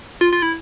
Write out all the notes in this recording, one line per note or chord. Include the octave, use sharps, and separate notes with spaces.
F4
F4
E4